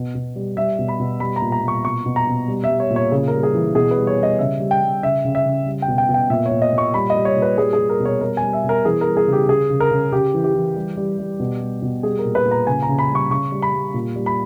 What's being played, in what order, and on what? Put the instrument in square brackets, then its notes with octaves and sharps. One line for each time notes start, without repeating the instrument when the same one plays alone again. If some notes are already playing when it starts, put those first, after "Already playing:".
Already playing: [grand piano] B2
B2
G3
G3 E5
B2
B5
B2
G3 B5
A#5
A#2
A#5
A#2
C#6
B2 C#6
B2
A#5
B2
G3
E5
G3
C#5
A#2
C#5
C#3 G#4
A#4
G3
G#4
E3
B2 G#4
B4
G3
C#5
G3
D#5
C#3 E5
G3
G5
G3
C#3 E5
C#3
E5
C#3
G3
G5
B2
G5
B2
G5
A#2 E5
C#5
A#2
D#5
A#2
C#6
G3 B5
D#5
G3
C#5
A#2
B4
G3 G#4
G#4
G3
A#4
B2
C#5
G3 A#4
G#5
G3
E5
B2
A#4
E3 G#4
A#4
G3
G#4
C#3
G4
C#3 G#4
C#3
A#4
C#3
C#3 G4
E3
G4
E3
G3
G3
G3
B2
G3
B2
G3 G#4
A#4
A#2
B4
A#2
A#5
C#3 G#5
A#5
C#3
B5
G3
C#6
C#3 C#6
G3
B5
G3
A#2
G3
B5